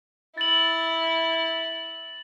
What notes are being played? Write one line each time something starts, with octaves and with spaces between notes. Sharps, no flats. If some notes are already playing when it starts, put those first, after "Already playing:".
E4 A6 F#7